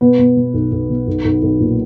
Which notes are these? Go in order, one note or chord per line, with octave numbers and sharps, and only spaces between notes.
B2 B3
B2
B2
B1
B1
B2
B1
B1
B1
A#2